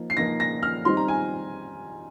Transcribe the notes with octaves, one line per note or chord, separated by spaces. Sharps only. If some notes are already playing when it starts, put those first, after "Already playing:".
Already playing: F3 A#3 D#4
C7
F3 A#3 D#4 A#6
A#6
F6
D#3 G3 C4 D#4 C6
A#5
G#5